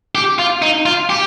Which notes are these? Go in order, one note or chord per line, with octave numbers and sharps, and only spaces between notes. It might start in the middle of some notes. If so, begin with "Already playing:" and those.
G4
F4
D#4
F4
G4